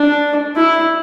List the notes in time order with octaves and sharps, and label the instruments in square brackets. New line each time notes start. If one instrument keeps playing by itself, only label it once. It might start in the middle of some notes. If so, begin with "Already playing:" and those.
Already playing: [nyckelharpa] D4
E4